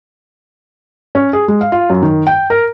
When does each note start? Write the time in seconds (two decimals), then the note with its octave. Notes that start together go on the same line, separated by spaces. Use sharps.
1.15 C#4
1.33 G#4
1.48 G#3
1.61 F5
1.72 F4
1.90 F#2
2.02 D#3
2.27 G5
2.50 A#4